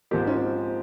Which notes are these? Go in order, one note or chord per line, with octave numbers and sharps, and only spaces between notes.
G#2 F3 A#3 C4 G4
C#4